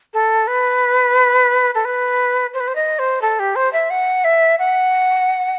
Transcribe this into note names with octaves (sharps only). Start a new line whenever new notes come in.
A4
B4
A4
B4
C5
B4
C5
D#5
C5
A4
G4
C5
E5
F#5
E5
F#5